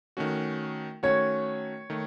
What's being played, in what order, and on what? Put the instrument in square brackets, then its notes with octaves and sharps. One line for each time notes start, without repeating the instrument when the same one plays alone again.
[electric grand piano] D#3 A3 C#4 F#4
[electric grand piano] D#3 A3 C#4 F#4 [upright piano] C#5
[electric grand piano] D#3 A3